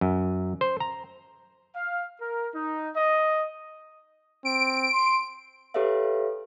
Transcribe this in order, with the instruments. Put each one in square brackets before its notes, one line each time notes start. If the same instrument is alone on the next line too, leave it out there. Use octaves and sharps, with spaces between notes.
[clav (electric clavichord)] F#2
C5
A#5
[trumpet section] F5
A#4
D#4
D#5
[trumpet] C4 [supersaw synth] D7
[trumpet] C6
[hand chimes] G4 A4 B4 C#5 E5 F5